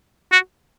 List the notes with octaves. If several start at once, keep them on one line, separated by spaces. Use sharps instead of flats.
F#4